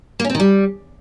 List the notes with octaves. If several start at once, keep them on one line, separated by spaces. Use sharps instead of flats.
A#3
C#4
C4
D#3
G3